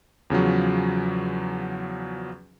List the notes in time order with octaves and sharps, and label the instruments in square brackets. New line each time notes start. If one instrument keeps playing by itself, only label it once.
[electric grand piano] E2 C#3 F3 F#3